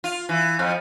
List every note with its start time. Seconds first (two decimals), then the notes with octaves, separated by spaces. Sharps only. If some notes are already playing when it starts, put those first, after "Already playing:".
0.04 F4
0.29 E3
0.59 F2 F3